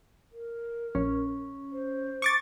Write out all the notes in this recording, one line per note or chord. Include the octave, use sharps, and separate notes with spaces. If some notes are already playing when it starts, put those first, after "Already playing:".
A#4
A#1 C#4
C5
C#6 D6 A6